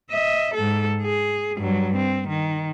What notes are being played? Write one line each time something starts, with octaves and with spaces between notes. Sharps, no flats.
D#5 E5
G#2 A4
G#4
G2 F#3
C4
D#3